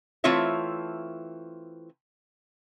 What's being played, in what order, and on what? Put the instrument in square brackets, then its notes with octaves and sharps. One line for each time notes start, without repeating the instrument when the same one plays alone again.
[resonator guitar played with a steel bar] E3 A3 C4 F4 C#5 E5